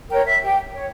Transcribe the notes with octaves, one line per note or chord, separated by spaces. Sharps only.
A#4 C#5 G5
E5
G4 G5
C#5